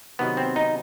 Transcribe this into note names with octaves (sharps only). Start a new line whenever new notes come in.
C3 D#3 F#3 B3
C4
D#4